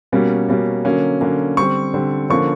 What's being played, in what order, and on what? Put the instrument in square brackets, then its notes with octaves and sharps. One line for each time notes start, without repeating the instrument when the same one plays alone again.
[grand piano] B2 G3 A#3 C#4
B2 G3 A#3 C#4
D3 F#3 A#3 C#4
D3 F#3 A#3 C#4
D3 G3 C4 C#6
D3 G3 C4
D3 F3 A#3 C#4 C#6